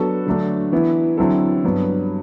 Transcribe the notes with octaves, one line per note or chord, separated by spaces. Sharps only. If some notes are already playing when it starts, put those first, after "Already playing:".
Already playing: F#3 B3 D4 F#4 A4
D3 F#3 A3 D4
E3 B3 E4
D3 F#3 C4 E4 A4
G2 F#3 B3